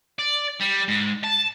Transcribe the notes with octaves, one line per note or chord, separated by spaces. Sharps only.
D5
G3
G#2
A5